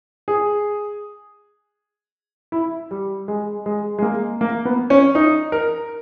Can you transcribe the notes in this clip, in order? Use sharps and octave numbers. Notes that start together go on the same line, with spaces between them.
G#4
E4
G3
G#3
G#3
G#3
A#3
A#3
B3
C#4
D#4
A#4